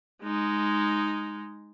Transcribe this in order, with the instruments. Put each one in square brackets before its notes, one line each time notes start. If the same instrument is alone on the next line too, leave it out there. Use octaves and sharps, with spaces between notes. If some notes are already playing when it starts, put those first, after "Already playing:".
[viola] G#3 D#4